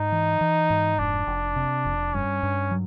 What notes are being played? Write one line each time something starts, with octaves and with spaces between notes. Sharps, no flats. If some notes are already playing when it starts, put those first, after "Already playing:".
Already playing: G#2 D#4
E3
E3
G#2
F1 D4
F1
C3
F1
G2 C#4
G2
F#3